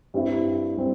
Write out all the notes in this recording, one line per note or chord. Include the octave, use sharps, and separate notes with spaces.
G2 G3 C4 E4
G3 C4